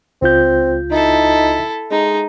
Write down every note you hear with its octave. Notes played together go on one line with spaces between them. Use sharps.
C#2 C4 F4 G6
D#4 E4 A4
G#3 D#4